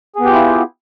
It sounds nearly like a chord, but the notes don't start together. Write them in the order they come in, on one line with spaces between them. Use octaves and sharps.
G#4 B3 G4 F4 E4